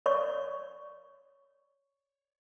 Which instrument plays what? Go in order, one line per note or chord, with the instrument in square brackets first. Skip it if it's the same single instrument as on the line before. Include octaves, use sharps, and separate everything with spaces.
[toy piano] C#5 D5 C#6